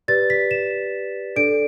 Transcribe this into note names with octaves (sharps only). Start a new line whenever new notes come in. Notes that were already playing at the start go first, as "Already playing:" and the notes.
G4 B4 D5 A6
B6
E7
D4 A4 D5 D7